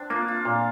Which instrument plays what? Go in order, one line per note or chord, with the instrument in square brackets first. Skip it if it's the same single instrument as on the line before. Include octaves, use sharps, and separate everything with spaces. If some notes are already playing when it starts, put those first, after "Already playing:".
Already playing: [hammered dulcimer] C4 D4
[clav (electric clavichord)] A#3 [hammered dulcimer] F4
[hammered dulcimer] F4
[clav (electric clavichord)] A#2